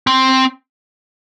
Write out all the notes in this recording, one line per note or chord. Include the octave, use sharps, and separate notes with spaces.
C4